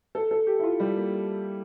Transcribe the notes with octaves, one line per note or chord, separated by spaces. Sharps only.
A4
A4
G4
E4
F4
G3
A#3